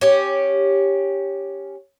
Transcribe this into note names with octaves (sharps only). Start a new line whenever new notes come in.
C#4 G4